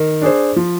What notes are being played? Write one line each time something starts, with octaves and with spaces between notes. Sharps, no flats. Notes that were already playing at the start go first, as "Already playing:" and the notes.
Already playing: D#3
D4 G#4 C5
F3